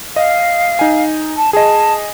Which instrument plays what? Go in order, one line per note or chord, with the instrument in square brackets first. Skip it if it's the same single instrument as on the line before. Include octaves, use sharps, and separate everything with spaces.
[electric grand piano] D#5 [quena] F5
[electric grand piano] D#4 G#5
[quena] A5
[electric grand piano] G#4 D#5 [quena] A5